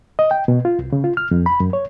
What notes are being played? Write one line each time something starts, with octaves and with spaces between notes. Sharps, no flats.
D#5
G5
B2
F4
C2
C#3
F4
F6
F2
B5
F#2
C#5